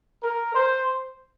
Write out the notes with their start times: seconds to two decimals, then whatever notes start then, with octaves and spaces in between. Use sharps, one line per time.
0.23 A#4
0.55 C5